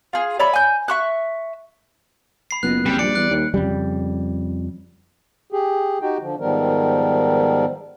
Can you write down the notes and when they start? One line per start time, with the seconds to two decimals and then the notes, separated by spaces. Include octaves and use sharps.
0.13 F4 G#4
0.39 C#5 D5 E5 B5
0.53 G#5 G6
0.88 E5 C#6 F#6
2.51 B5 C7
2.63 F#1 B3 F4 D#5 F#6
2.86 D2 G3 C4 C#5
2.99 A#1 G3 D5 G5 C#7
3.15 E2 F#6
3.30 D#2
3.54 F2 C#3 G3
5.52 G4 G#4
6.02 D#4 F#4 G4 G5
6.21 D3 F3
6.40 G#2 D#3 F3 G3 B3 A#4